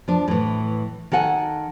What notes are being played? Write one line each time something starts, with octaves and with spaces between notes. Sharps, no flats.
F3 D4
A2 E3
D#3 A4 F#5 G#5